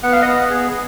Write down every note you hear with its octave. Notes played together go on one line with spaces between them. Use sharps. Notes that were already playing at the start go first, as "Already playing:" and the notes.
B3 F#5
F5
B3 D#5 F#5
G#4